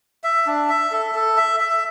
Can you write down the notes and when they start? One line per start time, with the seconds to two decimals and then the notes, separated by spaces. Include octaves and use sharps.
0.24 E5
0.46 D4
0.69 E5
0.92 A4
1.15 A4
1.37 E5
1.60 E5